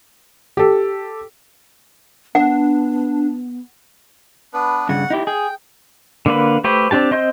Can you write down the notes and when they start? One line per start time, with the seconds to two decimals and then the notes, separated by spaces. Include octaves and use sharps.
0.57 G4 A4
2.35 B3 D4 F#5
4.54 B3 D4 B4
4.89 G2 C#3 F#5
5.10 D#4 E4 G4
5.27 G#4 G5
6.26 D3 A#3 B4
6.64 A3 G4 B4 C5
6.91 C4 D4 G4 A5
7.11 C4 D#5 C6 G6